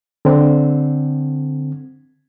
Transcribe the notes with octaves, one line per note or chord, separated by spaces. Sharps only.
D3 C4